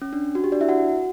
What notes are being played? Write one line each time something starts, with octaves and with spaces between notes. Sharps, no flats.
C#4
D4
F#4
G4
D4 D5
E4 E5
F#4 F#5